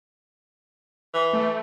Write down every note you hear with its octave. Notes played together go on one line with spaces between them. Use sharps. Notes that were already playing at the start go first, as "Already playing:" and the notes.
E3
A3